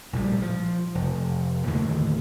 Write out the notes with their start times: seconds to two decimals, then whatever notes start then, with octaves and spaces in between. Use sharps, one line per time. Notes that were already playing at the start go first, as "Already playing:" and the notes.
0.13 A#1 A2 G3
0.42 F3
0.95 F1
1.68 D#2 A2 D3 D#3